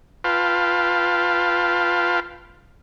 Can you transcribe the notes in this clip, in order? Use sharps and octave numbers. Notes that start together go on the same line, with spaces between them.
F4 B4 F5 G5 A5